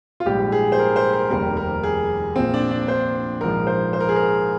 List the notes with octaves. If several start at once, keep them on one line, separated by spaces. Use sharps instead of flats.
F4
A#1 G#2 G3 G4
G#4
C5
A#4
C5
A#4
F1 D#2 D#3 G3 A#4
A#4
G#4
A#1 A#2 F3 C4
D4
D4
C5
A#1 G#2 F3 A#4
C5
C5
A#4
G#4
A#4